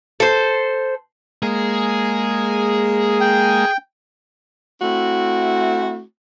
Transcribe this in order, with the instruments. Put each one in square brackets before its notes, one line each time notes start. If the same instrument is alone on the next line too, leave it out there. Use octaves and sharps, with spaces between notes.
[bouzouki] A4 C5
[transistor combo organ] G#3 A#3 [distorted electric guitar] G#4
[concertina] G5
[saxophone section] A3 C4 E4 F#4